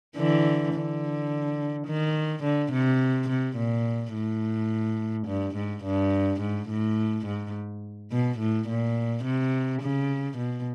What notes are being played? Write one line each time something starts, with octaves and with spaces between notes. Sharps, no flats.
D3 E3
D3
D#3
D3
C3
C3
A#2
A2
G2
G#2
G2
G#2
A2
G#2
B2
A2
A#2
C3
C#3
B2